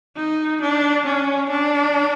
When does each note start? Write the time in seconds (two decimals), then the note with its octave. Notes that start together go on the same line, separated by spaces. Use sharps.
0.17 D#4
0.61 D4
1.06 C#4
1.50 D4